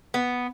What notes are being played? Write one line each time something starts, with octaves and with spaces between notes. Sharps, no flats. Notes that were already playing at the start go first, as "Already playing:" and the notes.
B3